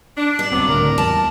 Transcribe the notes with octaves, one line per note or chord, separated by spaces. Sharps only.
D4
D5
C#2 G2 F#3 B3 C4
C#2 A2 D3 A#4
E2 A5